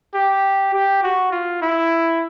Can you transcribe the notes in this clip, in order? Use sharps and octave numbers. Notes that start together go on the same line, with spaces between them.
G4
G4
F#4
F4
E4